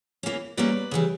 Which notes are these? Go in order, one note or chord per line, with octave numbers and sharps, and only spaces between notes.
E3 A#3 C#4
A#2 G3 A#3 C#4 B4 D5
C#3 E3 G3